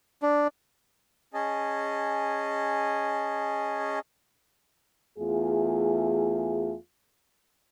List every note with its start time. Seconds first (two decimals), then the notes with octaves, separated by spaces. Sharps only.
0.22 D4
1.34 C#4 G#4 D#5 A5
5.18 E2 A3 F4 G#4